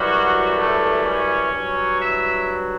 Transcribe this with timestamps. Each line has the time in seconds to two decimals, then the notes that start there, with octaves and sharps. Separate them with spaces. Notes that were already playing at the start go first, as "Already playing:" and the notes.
Already playing: F#2 E3 F#3 G3 F#4
0.56 A3 A4
1.04 C#4 C#5
1.53 G2
1.58 F#3
2.01 E4 E5